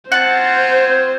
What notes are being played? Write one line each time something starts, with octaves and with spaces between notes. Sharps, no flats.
C4 F4 C5 C#5 F#5 A5